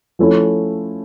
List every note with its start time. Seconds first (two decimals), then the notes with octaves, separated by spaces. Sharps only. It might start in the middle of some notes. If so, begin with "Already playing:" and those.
0.19 F3 A3 C#4 E4